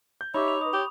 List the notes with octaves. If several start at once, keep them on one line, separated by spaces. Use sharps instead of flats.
G6
D#4 G4 C#5 E5 B5 C#6 D6 E6
F7
B4 D#5 D#6
G4 C#5